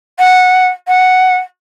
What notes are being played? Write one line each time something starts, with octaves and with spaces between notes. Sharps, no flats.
F#5
F#5